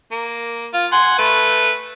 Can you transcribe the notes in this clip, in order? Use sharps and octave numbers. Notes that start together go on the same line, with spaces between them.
A#3
F4
F#5 G#5 C6
A3 B4